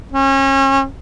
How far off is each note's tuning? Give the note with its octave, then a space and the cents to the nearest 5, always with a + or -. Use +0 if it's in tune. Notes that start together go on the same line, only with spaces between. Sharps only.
C#4 -35